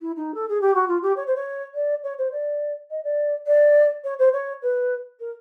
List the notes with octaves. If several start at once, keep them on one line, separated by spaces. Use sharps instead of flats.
E4
D#4
A4
G#4
G4
F#4
F4
G4
C#5
C5
C#5
D5
C#5
C5
D5
D#5
D5
D5
C#5
C5
C#5
B4
A#4